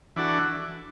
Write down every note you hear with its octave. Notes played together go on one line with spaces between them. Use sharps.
E3 D4 F#4 A4